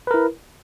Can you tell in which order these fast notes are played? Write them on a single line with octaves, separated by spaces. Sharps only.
B4 A#4 E4